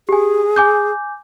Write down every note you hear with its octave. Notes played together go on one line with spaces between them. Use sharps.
G4 G#4 G#5
G#5 D6 G6